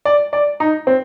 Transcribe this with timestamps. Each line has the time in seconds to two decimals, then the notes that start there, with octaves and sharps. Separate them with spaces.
0.05 D5
0.33 D5
0.60 D#4
0.87 C4